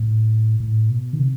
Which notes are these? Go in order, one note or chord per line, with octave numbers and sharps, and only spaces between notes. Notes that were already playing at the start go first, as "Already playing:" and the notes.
Already playing: A2
A2
B2
D#3
C3